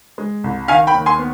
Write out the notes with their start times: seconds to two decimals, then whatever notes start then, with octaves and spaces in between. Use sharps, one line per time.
0.18 G#3
0.44 C2
0.68 D#3 F5 G#5
0.87 G5 B5
0.94 D#2
1.06 G#5 C6
1.19 B3